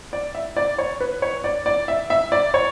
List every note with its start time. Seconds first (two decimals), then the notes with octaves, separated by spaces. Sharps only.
0.13 D5
0.35 E5
0.57 D5
0.78 C#5
1.01 B4
1.22 C#5
1.44 D5
1.66 D5
1.88 E5
2.10 E5
2.32 D5
2.54 C#5